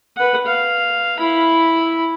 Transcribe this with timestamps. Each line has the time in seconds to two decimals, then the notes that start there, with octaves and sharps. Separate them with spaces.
0.17 B4 F#5
0.46 F5
1.17 E4 B5